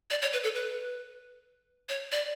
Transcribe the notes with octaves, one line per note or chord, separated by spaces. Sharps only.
D5
C#5
B4
A4
B4
C#5
D5